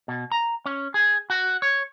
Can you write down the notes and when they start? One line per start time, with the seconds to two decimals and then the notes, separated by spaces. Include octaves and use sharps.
0.08 B2
0.32 A#5
0.66 C#4
0.94 G#4
1.30 F#4
1.62 C#5